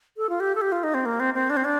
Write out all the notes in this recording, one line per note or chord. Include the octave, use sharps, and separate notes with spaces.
A4
F4
G4
A4
G4
F4
D#4
C4
A#3
C4
C4
D4
C4
D4